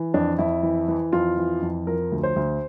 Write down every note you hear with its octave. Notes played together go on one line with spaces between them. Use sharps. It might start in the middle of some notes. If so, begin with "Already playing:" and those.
Already playing: E3
F2 D4
F2 E4
E3
E3
F2 F4
E3
F2
F3 A#4
D2
C5
D2